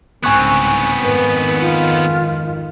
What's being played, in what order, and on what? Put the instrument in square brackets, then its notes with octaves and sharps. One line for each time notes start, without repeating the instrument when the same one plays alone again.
[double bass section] C2 G#2 C#3 [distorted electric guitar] B3 C4 [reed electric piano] G#5 C#6 F#6
[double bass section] F2 G#2 D#3 [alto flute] B4
[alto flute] F4